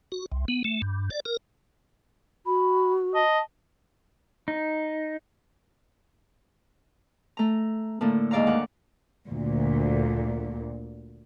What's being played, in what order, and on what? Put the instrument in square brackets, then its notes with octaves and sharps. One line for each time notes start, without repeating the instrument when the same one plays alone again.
[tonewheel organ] F#4
C2
B3
A3
G2
D5
A#4
[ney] F#4 [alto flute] B5
[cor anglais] D#5 [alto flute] A5
[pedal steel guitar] D#4
[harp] A3 A#5
A2 D3 A3 A#3
D#2 G#2 D5 F5 A#5
D2 F#5 D6
[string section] D2 A#2